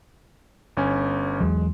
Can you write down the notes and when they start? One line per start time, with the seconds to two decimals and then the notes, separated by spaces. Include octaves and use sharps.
0.77 G1 C#4 G#5
1.40 E2 F#3 G#3